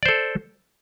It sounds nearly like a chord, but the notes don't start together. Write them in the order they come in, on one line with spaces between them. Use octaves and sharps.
D5 C5 A4